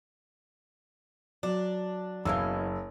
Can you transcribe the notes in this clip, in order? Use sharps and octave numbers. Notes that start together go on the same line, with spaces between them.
F#3 D4
F#1 B2 E3 C#4 F5 E6